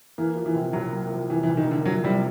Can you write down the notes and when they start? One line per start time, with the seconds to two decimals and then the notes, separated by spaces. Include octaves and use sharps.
0.18 E3 A#3
0.36 F3
0.46 E3
0.55 C3
0.73 C2 F#3
0.92 A#3
1.10 F3
1.29 C3 E3
1.43 E3
1.47 C2
1.57 D#3
1.67 D3 A#3
1.85 F3 F#3
2.04 C3 G3